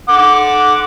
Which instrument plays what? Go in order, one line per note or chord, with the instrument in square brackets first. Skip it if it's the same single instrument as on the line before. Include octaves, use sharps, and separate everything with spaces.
[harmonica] F#5 D6